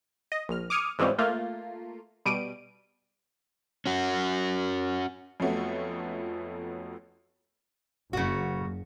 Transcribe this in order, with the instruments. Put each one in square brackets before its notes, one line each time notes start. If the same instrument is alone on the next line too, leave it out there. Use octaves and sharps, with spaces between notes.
[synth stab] D#5
A#1 F6
D6 D#6 F6 G#6 C#7 D#7
G#2 E3 F3 G3 C4 C#4
A3 A#3 F4
B2 G3 D7 D#7
[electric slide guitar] C#4 F#4
[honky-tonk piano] F2 F3 F#3 A3 B3 C#4
[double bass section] F#1 [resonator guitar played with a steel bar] C#3 F#4